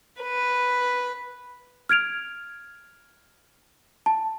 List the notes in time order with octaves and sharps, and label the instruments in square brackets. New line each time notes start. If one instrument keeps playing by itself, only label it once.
[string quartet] B4
[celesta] F6 G#6 D7 F7
A5